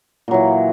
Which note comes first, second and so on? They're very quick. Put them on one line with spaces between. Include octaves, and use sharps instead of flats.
A#2 F#3 E3